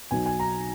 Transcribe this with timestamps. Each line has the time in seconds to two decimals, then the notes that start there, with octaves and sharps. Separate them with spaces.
0.11 B1 B2 F#3 G#5
0.26 G#5
0.40 A#5